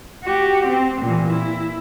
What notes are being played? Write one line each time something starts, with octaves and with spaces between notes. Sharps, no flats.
F#4 G4
C4
A#2 E3
E4